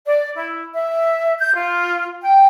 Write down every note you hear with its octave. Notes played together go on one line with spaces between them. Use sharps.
D5
E4
E5
G6
F4
G5